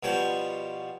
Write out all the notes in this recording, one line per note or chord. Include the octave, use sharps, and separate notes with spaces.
B2 F3 G3 C#5 G5